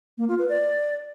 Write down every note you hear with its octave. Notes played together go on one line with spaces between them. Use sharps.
A#3
F4
B4
D5